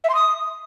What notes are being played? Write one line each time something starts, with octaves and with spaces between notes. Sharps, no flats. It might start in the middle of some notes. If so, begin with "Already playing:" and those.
E5
C6
D#6